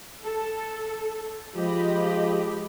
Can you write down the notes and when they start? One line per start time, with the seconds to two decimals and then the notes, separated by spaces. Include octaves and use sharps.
0.24 A4
1.55 F3 G#3 G4 D#5 B5